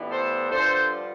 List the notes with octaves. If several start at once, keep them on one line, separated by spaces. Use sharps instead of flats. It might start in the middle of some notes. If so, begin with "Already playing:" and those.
Already playing: A2 E3 G3 B3
A4 C5
G2 D3 F3 A4 C5